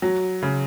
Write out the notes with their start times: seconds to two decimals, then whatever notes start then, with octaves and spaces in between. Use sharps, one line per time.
0.02 F#3
0.42 C#3